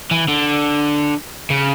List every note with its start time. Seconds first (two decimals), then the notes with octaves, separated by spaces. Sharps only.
0.11 E3
0.28 D3
1.50 C#3